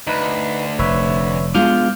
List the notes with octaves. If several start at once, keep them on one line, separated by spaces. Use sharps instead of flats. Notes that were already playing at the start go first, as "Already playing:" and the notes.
D2 D#4 B4
F1 B4 C#5 E5
G#3 B3 D4 F4 D6 F6 G6